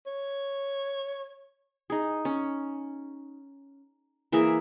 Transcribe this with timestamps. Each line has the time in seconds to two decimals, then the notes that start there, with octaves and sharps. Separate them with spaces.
0.07 C#5
1.90 D#4 G#4
2.25 C#4
4.32 E3 A#3 G#4 E5